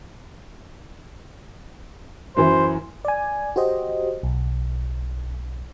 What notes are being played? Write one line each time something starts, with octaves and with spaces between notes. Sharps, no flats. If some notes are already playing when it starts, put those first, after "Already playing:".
F#2 E3 C5
D5 G#5
F#4 G4 C5 D#5
B1